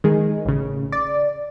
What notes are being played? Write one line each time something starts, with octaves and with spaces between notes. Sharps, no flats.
D#3 G#3
A1 C#3
D5